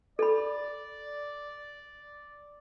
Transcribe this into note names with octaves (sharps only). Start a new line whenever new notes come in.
A4 D5 B5